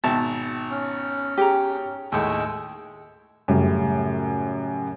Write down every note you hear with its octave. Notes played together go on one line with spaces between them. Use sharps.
G#1 B2 E5 A5
C#4
G4 G#4 A#5
D#2 A2 G#3 E6
F#2 A2 C#3 G3